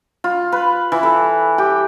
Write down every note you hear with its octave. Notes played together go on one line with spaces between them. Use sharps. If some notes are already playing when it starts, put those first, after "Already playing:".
F4
B4
E3
A4
G4